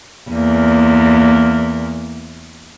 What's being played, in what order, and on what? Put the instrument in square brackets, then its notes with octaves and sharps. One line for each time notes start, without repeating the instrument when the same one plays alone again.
[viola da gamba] E2 A#3